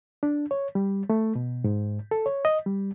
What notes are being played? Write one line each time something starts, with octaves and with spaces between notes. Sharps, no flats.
D4
C#5
G3
A3
B2
G#2
A4
C#5
D#5
G3